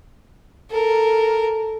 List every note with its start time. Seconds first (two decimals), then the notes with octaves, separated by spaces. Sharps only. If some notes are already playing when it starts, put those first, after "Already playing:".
0.70 A4 A#4